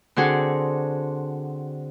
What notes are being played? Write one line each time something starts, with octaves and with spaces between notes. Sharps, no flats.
D3 C4 F#4 G#4 A4